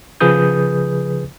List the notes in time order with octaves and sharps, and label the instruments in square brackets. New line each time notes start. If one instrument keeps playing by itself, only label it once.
[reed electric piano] C#3 F3 G#4 B4 D#6 G6